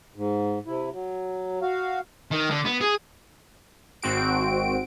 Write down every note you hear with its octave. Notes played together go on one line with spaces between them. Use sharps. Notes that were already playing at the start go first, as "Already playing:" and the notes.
G#2
C3 E4
F#3
F#4 F5
D#3
D3
B3
G#4
G#1 C4 F#4 D7